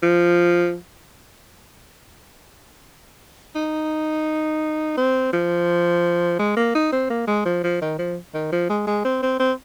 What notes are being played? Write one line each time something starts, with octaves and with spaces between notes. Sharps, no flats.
F3
D#4
C4
F3
G#3
A#3
D#4
C4
A#3
G#3
F3
F3
D#3
F3
D#3
F3
G#3
G#3
C4
C4
C4